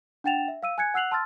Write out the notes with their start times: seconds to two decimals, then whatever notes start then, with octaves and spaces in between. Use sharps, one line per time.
0.24 D4 F#5 G5 A6 E7 F7
0.48 E5
0.63 F5 E6 D#7
0.78 G#5 F#6 G#6 C#7
0.94 F#5 E6 F#6 C7 F7 F#7
1.11 A5 C6 E6 F6 A6